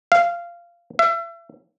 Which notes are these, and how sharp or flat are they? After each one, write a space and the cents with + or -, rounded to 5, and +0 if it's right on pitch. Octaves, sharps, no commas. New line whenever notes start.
F5 -15
E5 +35